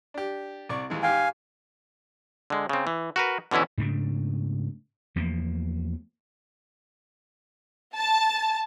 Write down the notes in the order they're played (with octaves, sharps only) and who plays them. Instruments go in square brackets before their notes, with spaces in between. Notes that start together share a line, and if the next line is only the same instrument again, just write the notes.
[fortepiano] D4 G4
C2 D5 C#6
D#2 E3 G#3
[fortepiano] G#2 G4 G5 [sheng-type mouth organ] F5 G#5
[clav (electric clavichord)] D3 G#3
C#3 C4
E3
F#4 A#4 B4
B2 D3 E3 C#4 E4
[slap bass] G#2 C#3 A3 D4
E2 F3 A3 A#3
[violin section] A5